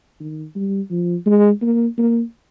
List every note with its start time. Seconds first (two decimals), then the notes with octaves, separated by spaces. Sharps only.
0.20 D#3
0.55 G3
0.91 F3
1.26 G#3
1.62 A#3
1.98 A#3